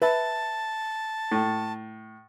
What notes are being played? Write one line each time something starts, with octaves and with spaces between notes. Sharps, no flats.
B4 E5 A5 B5
A2